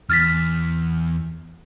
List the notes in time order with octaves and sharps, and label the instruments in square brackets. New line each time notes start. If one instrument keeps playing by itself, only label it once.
[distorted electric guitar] E2 [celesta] F6 A6 B6